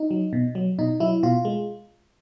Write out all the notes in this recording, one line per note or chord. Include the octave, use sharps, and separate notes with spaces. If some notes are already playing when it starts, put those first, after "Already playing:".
Already playing: D#4
F#3
B2
F#3
B2 D#4
F#3 E4
B2 F4
G#3